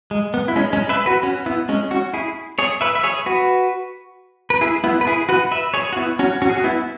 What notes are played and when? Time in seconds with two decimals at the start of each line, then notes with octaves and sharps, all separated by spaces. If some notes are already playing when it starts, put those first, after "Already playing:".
0.11 G#3
0.34 B3
0.48 E4
0.56 G#3 C#4
0.73 G#3 C#4
0.89 B4 E5
1.06 F#4 B4
1.23 C#4 F#4
1.46 B3 E4
1.69 G#3 C#4
1.91 C#4 F#4
2.14 E4 G#4
2.59 G#4 C#5
2.81 B4 E5
2.95 E5
3.03 G#4 C#5
3.26 F#4 B4
4.50 B4
4.61 E4 G#4
4.84 B3 E4
5.01 B4
5.07 E4 G#4
5.29 F#4 B4
5.52 B4 E5
5.74 G#4 C#5
5.93 F#4
5.97 B3 E4
6.19 C#4 F#4
6.42 C#4 F#4
6.49 G#4
6.57 F#4
6.64 B3 E4